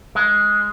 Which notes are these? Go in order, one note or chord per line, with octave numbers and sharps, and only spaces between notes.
G#3